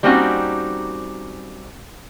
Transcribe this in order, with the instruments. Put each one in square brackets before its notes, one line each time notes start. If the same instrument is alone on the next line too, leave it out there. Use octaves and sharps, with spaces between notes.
[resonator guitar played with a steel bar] G3 A#3 C4 C#4 D#4 F#4